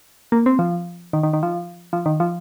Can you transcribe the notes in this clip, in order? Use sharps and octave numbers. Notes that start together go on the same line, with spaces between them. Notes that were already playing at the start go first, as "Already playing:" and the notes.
A#3
C4
F3
D#3
D#3
D#3
F3
F3
D#3
F3